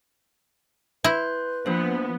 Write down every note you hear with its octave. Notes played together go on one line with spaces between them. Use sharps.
E4 B4 C6 G6
F3 A#3 B3 D4 C5